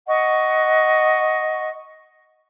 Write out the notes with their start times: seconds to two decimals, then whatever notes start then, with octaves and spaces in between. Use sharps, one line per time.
0.07 D#5 F#5 C#6